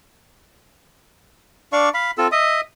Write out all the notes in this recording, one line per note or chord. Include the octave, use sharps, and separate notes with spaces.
D4 D5 F5 C#6
F5 B5
C4 F4 A4 E6
D#5 E5 D#6